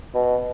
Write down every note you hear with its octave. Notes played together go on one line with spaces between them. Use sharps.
B2